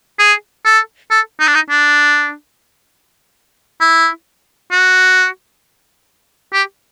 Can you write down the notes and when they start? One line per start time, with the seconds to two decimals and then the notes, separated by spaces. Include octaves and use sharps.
0.19 G#4
0.65 A4
1.11 A4
1.40 D#4
1.48 D4
1.55 D#4
1.70 D4
3.81 E4
4.72 F#4
6.53 G4